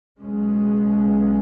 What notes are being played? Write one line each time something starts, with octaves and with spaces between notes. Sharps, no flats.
B1 B2 G#3 C#4